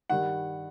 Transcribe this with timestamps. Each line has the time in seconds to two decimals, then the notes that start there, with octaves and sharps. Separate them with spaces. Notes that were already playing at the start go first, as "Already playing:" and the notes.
0.10 G2 D#3 G3 F#5